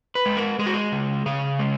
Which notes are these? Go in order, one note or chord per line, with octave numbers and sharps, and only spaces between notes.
B4
G#3
A#4
G#3 G#4
F#4
G#4
C#3
C#3 G#4
G#3